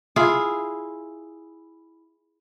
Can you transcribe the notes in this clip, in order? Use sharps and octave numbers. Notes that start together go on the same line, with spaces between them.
E4 F4 G#4